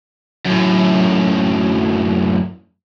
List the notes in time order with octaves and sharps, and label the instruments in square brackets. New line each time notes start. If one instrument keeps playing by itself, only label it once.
[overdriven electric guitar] F#2 A2